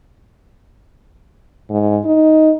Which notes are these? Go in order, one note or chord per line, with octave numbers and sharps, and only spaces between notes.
G#2
D#4